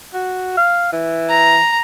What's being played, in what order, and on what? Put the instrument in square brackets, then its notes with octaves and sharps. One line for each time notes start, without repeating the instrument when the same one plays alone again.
[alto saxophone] F#4
F5
E3
[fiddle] A#5